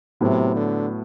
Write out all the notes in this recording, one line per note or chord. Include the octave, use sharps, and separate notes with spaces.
A2 C3 F#3 B3
D3